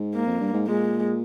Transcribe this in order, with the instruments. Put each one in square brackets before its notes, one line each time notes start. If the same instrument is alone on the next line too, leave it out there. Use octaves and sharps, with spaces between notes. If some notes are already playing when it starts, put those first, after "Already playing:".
Already playing: [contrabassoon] G#2
[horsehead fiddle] A#3
[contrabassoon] F2
G2
G#2
[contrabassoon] A#2 [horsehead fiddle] G#3